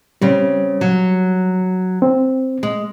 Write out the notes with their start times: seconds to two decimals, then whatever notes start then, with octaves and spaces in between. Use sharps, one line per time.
0.21 C#3 G3 C4
0.81 F#3
2.02 C4
2.63 G#3